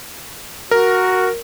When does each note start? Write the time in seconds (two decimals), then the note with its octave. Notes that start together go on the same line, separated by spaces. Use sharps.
0.71 F#4 A#4